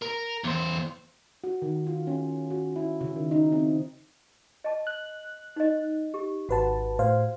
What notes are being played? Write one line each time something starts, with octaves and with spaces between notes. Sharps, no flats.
A#4
E2 C5
F#4
D#3
F4
C#4
F#4
E4
C#3
D#3
D#4
C4
D#5 A5
F#6
D#4 D#5
G4
G#1 F#4 B4 F#5 A5
A2 C5 F5